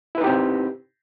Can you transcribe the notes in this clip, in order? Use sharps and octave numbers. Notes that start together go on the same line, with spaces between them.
C4 D#4 E4 G4 B4